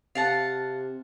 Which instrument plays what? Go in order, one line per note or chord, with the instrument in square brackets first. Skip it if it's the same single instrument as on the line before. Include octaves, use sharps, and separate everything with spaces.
[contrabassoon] C3 [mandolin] F5 F#5 A5